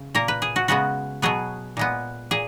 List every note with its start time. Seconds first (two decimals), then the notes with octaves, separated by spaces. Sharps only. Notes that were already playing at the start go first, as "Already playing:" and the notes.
Already playing: C#3
0.15 A#2 A#3 A#4
0.28 B4
0.42 G#4
0.56 F#4
0.68 C#3 G#3 B3 F#4
1.22 B2 F#3 B3 G#4
1.77 A#2 G#3 B3
2.31 A#2 G#4